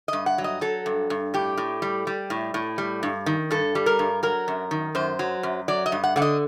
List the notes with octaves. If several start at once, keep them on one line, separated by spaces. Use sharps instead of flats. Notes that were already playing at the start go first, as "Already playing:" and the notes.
G2 D#5
F#5
F#3
D#5
F#3 A4
G2
G2
A2 G4
A2
G3
G3
A2
A2
G3
G2
D#3
G2 A4
G3
A#4
G2
F#3 A#4
F#2
D#3
F#2 C5
F#3
F#2
F#3 D5
D#5
G2
F#5
D3 F#5
D#5